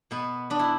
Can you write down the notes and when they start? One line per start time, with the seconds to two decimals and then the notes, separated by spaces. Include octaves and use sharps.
0.11 B2 B3
0.50 B3 D4
0.59 E4